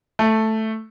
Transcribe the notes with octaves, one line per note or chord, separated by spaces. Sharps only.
A3